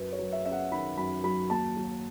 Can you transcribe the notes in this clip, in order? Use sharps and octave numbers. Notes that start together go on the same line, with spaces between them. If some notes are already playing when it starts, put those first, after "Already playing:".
Already playing: F#2 B4
C#5
F#3
E5
C#4 E5
F#5
D#3 B5
F#2 B5
F#3 B5
D#2 A5
F#3